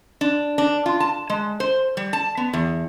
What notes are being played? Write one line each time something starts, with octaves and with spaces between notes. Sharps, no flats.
D4
D4
F4
A5
G#3
C5
G3
A5
B3
E2